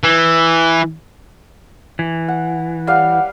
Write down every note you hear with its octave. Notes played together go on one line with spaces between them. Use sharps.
E3
E3
F#5
G3 B4 F5 F#5